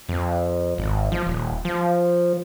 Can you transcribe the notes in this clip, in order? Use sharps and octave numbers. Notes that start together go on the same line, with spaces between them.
F2
G#1
F3
D#1
F3